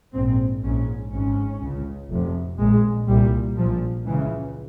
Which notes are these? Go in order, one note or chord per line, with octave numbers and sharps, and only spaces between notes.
A#1 G#2 C4
A#1 G#2 C#4
G#1 G#2 C#4
C#2 C#3
F1 F2 C3
A#1 A#2 G#3
C2 A#2 G3
A#1 A#2 F3
C#2 C#3 E3